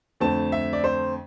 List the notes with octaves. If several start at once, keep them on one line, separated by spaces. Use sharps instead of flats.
F2 D3 A3 C4 A5
E5
D5
C5